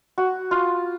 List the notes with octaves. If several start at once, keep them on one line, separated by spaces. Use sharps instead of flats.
F#4
F4